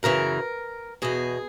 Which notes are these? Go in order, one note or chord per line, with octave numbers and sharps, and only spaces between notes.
F#2 C#3 E3 A#4
E2 B2 G#4